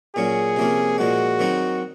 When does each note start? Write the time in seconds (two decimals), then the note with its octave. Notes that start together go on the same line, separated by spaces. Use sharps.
0.15 A#2 F#3 C#4 G#4
0.56 C3 F3 A#3 C#4
0.98 A#2 F3 G#3 F#4
1.39 D#3 F#3 C4 D#4